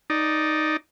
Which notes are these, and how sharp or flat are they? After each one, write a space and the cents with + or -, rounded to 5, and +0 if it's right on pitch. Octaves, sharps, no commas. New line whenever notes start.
D#4 +0 D5 +0